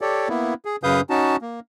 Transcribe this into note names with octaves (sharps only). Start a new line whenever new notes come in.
G4 A4 C#5 D5
A#3 B3 E4
G#4
F#2 C#3 B4 F5 D#6 G6
C#4 D#4 F#4 A5
A#3